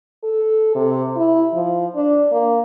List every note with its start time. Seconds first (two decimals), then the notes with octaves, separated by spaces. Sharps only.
0.23 A4
0.75 C3
1.16 E4
1.53 F3
1.96 D4
2.32 A#3